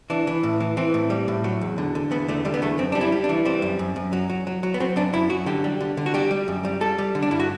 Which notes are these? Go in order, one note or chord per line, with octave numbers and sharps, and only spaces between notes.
E3 D4
E3
A2
E3
E3 C4
A2
G3
A2
F#3
E2
D3
D3
E2 B3
D3 A3
D3 G3
B3
E2 A3
F#2 C4
G3 D4
E4
G3
D4
E3
G3 C4
F#2
F#2
F#2
F#3
F#3
F#3
F#3
B3
F#3 C4
F#2 D4
F#2 E4
F#3 F#4
D3 G4
G3
D3
D3
F#4
G3 G4
G3
F#2
G3
G3 A4
G3
D3
D4
G2 E4
F#4